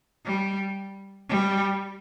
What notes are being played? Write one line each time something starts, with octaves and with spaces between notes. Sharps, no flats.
G3
G3